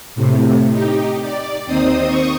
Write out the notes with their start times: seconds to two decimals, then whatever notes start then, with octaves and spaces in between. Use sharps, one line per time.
0.15 A2 C3
0.72 D#4 G4
1.22 D5
1.66 D#2 C4 D#4 C5 D#6
2.07 C#6 D#6